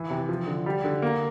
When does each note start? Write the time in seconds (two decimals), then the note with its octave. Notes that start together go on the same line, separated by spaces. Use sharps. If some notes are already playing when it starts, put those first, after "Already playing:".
Already playing: E3
0.10 C3
0.29 F3
0.47 D3
0.66 G3
0.84 D3
1.02 A#3